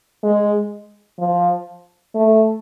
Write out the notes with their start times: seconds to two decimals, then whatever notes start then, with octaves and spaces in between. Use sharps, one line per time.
0.23 G#3
1.19 F3
2.15 A3